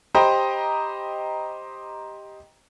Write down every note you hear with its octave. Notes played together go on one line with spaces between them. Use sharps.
G4 C5 D#5 G5 A#5 B5